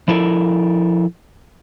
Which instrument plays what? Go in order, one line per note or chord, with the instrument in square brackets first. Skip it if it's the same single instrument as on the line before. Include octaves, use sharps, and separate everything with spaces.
[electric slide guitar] F3 E4 A4 A#4